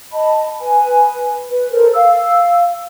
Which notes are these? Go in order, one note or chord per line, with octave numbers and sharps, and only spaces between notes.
D#5 A5 B5
B4 G#5
B4
A4 A#4 C5
F5 E6